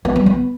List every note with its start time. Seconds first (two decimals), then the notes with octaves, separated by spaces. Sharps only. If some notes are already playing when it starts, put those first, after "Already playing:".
0.05 B3
0.16 G3
0.26 B3